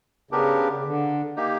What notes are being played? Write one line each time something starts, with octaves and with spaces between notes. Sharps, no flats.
C#3 B3 D4 G4 A#4
C#3
D3
A#3 D#4 G4